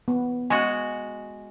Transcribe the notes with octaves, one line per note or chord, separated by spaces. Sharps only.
B3
G#3 F#4 G#5